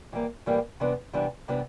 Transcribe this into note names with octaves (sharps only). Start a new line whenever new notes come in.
A2 E3 G3 A#3
A2 E3 G3 A#3
C3 E3 G3 B3 D4
C3 E3 G3 B3 D4
C3 E3 G3 B3 D4